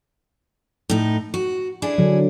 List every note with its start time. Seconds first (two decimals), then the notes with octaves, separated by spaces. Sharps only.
0.89 A2 D#4
1.34 F#4
1.82 D4 E4 G#4
1.98 D3 F#3